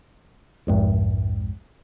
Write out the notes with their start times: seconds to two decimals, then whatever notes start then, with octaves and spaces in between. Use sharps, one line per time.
0.67 B1 F2 G#2